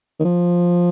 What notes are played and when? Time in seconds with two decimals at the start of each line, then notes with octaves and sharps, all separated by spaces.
0.20 D#3
0.25 F3